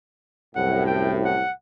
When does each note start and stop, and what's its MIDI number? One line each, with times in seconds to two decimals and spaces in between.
0.56 1.43 36
0.56 1.43 42
0.56 1.43 45
0.56 0.82 78
0.86 1.13 79
1.24 1.53 78